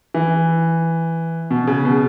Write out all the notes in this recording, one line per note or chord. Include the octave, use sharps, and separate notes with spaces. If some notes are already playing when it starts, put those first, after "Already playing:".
E3
B2
C#3
B2